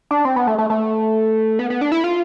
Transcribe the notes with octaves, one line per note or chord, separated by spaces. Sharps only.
D4
C4
B3
A3
A3
A3
B3
B3
D4
E4
F4